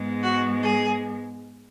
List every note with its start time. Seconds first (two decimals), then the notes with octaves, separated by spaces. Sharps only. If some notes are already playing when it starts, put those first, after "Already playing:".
Already playing: G#2 G#3 B3
0.23 F#4
0.63 G#4